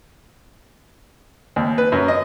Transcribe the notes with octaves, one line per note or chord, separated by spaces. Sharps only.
D#2
B4
F#2
D#5